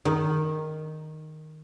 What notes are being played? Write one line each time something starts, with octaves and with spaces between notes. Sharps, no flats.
D#3